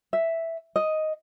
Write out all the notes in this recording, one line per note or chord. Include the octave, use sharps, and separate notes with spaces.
E5
D#5